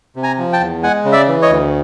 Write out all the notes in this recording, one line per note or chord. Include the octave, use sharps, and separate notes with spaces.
C3
G#5 A#5
F3
G5 A5
E2
G#3 F#5 G#5
C#3
D5 E5
E3
C#5 D#5
D2